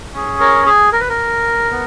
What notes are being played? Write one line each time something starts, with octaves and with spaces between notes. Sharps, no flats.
C#4 G#4
A#4 C#5
G#4
A#4
B4
A#4
B3